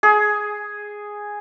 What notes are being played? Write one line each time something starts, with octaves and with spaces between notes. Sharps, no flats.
G#4